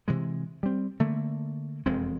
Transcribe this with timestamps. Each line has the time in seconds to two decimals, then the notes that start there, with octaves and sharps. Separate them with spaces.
0.08 C3 E3 G#3
0.63 G3 C4
1.00 D3 A3 A#3
1.86 E1 F2 G#3 C4